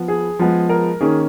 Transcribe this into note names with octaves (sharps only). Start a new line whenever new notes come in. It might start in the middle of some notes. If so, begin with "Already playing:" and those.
Already playing: F3 B3
G#4
F3 G#3 B3
A#4
D#3 A#3 C#4 G#4